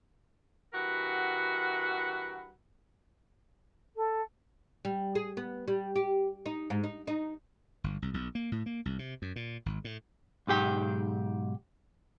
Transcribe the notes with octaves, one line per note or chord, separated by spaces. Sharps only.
G2 E3 F#4 A#4 F#5 B5
A4
G3
G#4
B3
G3
G4
D#4
G#2
D#4
D#4
G1
C2
B1
A#3
A2
A#3
C2
C3
F#2
A#2
G#1
A2
B1 G#2 G4 G5